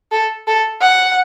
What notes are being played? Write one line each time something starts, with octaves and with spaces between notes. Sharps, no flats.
A4
A4
F#5